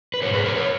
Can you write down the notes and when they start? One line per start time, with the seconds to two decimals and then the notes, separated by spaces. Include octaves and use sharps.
0.14 B4
0.22 G#2 D#3 A#4 C#5
0.33 G#4 B4
0.44 A#4 C#5
0.56 A#4 C#5